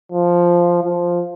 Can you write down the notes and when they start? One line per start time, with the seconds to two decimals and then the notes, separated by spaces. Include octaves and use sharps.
0.12 F3
0.84 F3